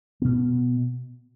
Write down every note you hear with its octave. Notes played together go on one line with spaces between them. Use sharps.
B2 B3